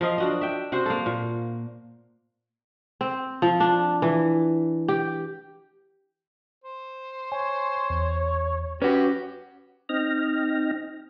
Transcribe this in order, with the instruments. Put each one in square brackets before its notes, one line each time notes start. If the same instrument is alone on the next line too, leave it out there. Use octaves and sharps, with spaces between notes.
[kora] F3 A#4 D#5 F5
D4 F#4 D#5
E5 G5
C3 F#4 C5
A#3 A4
A#2
C4
F3
D4
E3
G4
[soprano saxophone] C5
[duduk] C#5 [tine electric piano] G#5
[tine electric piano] E2
[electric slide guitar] C#4 F#4 [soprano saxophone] G4 [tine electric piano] B4
[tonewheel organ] C4 D#4 D#5 G5 F6 A#6